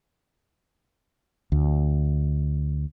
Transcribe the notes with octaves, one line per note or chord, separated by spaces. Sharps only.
D2